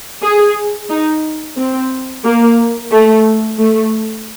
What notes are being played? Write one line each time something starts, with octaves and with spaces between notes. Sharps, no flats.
G#4
D#4
C4
A#3
A3
A3